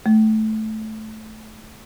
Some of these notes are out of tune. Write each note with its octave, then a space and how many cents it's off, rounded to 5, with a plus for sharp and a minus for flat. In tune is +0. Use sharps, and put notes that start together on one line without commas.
A3 -15